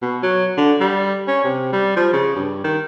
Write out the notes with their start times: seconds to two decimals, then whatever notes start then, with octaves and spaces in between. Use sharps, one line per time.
0.02 B2
0.23 F#3
0.57 D3
0.80 G3
1.28 C#4
1.44 C3
1.73 G3
1.96 F3
2.13 C#3
2.36 G2
2.64 D#3